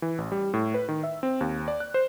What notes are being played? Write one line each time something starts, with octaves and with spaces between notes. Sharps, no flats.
E3
A1
G3
A2
B4
D#3
E5
C4
D#2
D5
F#6
C5